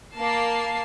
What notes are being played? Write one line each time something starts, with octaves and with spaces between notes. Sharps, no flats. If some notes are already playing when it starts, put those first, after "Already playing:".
A#3 A5 C7